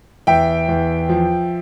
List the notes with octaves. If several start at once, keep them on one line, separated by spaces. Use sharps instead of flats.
E2 E5 G5
E2
F3